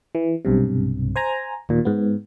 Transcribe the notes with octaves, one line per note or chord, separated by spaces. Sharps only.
E3
B1 G2 C3
C5 G#5 A#5
D#2 A#2
G#2 B3